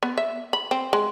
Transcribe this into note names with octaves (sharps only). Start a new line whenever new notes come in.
B3
E5
B5
C4
G#3